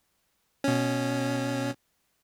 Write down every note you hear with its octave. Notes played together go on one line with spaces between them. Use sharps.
B2 C#4